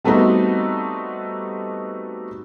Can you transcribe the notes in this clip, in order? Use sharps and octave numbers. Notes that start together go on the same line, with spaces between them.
G3 A3 B3 C4 D#4 F#4